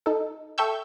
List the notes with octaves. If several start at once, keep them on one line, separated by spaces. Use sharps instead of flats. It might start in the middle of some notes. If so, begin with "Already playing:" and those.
D#4 A4
A4 E5 G5 C#6 E6 G6